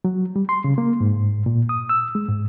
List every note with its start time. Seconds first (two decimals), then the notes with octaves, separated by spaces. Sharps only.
0.05 F#3
0.36 G3
0.49 C6
0.64 C#3
0.78 A#3
1.00 G#2
1.46 A#2
1.69 D#6
1.89 E6
2.15 G#3
2.28 G#2